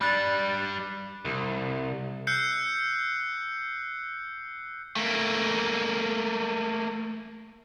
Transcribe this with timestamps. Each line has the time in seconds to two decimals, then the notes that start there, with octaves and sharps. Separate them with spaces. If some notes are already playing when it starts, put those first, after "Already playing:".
0.01 G3 D4 B5 F#6 A6
1.25 C2
2.27 E6 F#6 G6 C7 C#7
4.96 A3 A#3